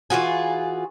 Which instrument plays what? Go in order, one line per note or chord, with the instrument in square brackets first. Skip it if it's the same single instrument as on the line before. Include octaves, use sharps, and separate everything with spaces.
[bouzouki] E3 F4 F#4 G#4